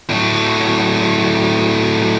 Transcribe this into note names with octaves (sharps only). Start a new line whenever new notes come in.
A2 F#3